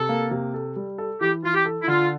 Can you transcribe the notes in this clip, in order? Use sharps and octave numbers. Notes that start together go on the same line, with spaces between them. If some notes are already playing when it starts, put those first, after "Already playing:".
Already playing: C3 A4
A#3
C3
A4
G3
A4
E3 G4
E3 F4
G4
A4
E4
D3 F4